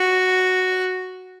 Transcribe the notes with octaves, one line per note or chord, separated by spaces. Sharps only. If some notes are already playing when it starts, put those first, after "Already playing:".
Already playing: F#4